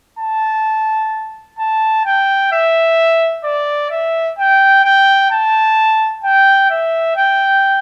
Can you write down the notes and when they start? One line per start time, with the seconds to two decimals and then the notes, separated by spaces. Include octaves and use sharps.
0.19 A5
1.58 A5
2.05 G5
2.52 E5
3.44 D5
3.91 E5
4.38 G5
4.84 G5
5.31 A5
6.23 G5
6.70 E5
7.16 G5